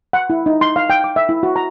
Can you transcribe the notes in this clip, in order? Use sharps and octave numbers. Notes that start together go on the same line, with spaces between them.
F#5
E4
D#4
C6
F5
G5
D6
E5
E4
F#4
A#5